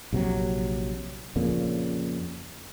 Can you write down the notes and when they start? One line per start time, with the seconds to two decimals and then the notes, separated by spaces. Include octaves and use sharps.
0.13 A#1 C3 F3 F#3
1.36 F2 A#2 C#3